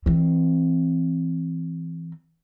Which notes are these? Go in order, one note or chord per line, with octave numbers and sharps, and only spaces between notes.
E3 C4